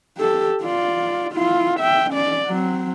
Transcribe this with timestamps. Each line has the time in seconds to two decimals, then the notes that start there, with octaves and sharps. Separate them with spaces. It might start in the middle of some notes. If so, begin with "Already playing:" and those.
0.19 G4 A4
0.63 F4 D5
1.33 E4 F4
1.80 E5 G5
2.11 C#4 D5
2.47 F#3 C4